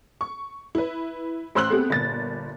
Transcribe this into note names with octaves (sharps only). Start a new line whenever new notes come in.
C#6
E4 B4
A1 C5 C6 E6 F#6 F#7
A3 B3 C4 G4 G#4
G1 A#2 A6